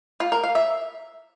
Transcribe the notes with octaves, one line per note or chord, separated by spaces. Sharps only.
F4
A#4
F5
E5